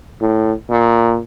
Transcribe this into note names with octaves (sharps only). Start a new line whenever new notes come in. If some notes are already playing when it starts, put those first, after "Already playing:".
A2
A#2